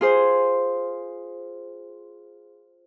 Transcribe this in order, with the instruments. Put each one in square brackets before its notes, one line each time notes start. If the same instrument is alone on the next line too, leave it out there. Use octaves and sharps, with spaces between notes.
[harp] F4 G#4 C5